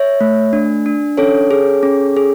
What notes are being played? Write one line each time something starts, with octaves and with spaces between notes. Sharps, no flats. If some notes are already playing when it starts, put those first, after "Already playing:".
Already playing: C#5 E5
A3
D4
D4
C#4 A4 C#5
G#4
C#4
G#4